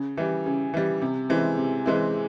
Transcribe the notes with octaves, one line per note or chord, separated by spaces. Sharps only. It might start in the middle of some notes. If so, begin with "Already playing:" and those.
Already playing: C#3
E3 G3
C#3
E3 G3
C3
E3 G#3 C4 E4
C3
E3 G#3 C4 E4